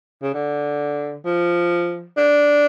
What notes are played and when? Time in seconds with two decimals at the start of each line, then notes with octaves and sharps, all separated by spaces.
0.22 C#3
0.34 D3
1.25 F3
2.17 D4